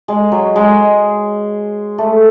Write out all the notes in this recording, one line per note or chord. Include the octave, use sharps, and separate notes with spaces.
G#3
F#3
G#3
A3